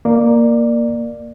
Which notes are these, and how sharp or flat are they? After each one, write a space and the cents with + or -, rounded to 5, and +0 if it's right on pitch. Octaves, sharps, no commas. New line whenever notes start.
A#3 +0 D5 +15